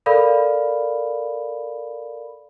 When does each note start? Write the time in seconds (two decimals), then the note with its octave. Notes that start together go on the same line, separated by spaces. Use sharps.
0.06 A4 A#4 D5 F5 B5